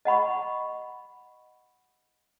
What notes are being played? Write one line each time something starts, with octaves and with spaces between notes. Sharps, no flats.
D#5 F#5 B5 C#6